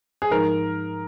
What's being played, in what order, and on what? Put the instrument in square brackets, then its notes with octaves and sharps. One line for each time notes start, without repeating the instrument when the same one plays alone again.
[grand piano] G#4
[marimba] G#2 F3 G#3 D#4 [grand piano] A#4